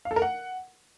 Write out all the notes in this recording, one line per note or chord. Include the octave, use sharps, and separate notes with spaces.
F5
A4
A#4
F#5